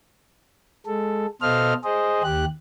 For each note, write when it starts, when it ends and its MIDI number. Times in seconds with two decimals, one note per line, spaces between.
0.86 1.26 56
0.86 1.26 69
1.42 1.74 47
1.42 1.74 69
1.42 1.74 72
1.42 1.74 75
1.42 1.74 77
1.42 1.74 89
1.84 2.22 68
1.84 2.22 72
1.84 2.22 75
2.23 2.45 39
2.23 2.45 67
2.23 2.45 90